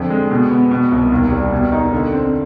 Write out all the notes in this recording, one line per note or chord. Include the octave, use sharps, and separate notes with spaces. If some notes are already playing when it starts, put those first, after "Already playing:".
Already playing: F2 D3
G#3
B2
B3
B2
C2
D#2
G3
B2
D#4
D3
C4